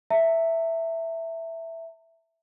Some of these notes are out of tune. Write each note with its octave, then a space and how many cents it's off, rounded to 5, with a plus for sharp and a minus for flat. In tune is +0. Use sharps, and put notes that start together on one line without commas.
E5 +0 A#5 -45